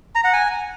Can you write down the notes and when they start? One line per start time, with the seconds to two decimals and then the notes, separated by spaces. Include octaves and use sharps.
0.15 A#5
0.24 F#5
0.33 G#5